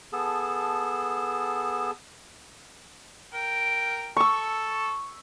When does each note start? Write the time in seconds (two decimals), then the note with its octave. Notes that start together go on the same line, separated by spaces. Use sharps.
0.13 B3 G#4 A4 A5
3.33 A#4 G5
4.17 A4 C#6 E6